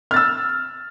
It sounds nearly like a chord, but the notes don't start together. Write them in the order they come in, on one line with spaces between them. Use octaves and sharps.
F6 A6 E6